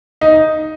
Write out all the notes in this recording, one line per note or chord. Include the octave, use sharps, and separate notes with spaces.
D#4